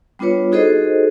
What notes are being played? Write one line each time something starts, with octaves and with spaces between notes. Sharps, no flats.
G3 B3 D4 F4 B4 C#5
D#4 F#4 G#4 A4 C5 D#5